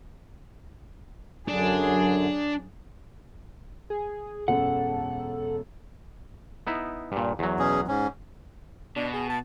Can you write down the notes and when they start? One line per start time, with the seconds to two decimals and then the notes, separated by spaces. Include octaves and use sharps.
1.48 F#2 D3 F#3 D4 G#4
3.90 G#4
4.48 E1 F#2 A4 F#5
6.67 B3 D#4 E4
7.12 G2 A#2
7.39 E2 F#3
7.59 B2 C#4 G#4
7.88 G#2 C#4
8.96 B2 D4
9.13 G#4
9.30 A5